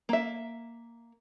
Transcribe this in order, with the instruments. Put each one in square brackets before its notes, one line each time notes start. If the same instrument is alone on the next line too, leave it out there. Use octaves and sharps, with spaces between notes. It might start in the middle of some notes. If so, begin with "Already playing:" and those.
[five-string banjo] A#3 E5